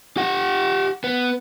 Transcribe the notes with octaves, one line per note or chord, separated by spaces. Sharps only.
G4 F#5
B3